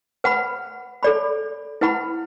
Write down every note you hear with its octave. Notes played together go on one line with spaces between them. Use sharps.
B4 F#5 B5
A4 D5 B5
E4 B4 F#5 B5